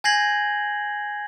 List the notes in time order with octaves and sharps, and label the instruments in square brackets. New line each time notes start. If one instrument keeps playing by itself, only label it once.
[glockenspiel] G#5 G6 G#6 A#6 C7 F#7